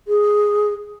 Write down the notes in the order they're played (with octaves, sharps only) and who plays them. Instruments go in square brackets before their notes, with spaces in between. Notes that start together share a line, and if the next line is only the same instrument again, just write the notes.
[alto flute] G#4